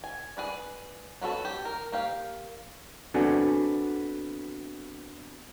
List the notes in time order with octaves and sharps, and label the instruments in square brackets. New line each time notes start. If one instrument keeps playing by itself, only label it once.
[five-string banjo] G#5
G#4 B4 D5
F#3 B3 F#4 A4
G4
A#4
A#3 G4 F5
[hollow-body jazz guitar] B3 C4 D4 F#4 A4 G#5